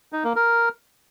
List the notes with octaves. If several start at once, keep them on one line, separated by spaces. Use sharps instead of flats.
D#4
A#3
A#4